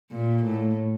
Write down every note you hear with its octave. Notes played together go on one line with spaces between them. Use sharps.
A#2
A2